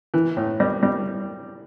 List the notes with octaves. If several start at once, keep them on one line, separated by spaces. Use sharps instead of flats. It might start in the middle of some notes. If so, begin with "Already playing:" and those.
E3
A2
G3
G3